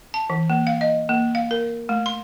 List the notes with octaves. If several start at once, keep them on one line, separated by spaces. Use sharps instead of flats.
A5
E3
A#3
F5
D#5
A#3
F5
A#4
A3
C6